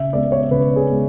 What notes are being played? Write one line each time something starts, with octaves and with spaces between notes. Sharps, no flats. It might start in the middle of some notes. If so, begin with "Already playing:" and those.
Already playing: C#3 E5
G#3 B3 D5
C#5
C#3 B4
G#4
G#3 B3